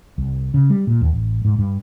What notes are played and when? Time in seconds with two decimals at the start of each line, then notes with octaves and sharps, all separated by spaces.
0.18 C2
0.54 C#3
0.70 G3
0.87 A#2
1.01 D#2
1.13 A1
1.45 G#2
1.58 G2